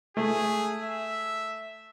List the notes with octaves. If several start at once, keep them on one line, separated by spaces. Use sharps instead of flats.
A3 G#4
E5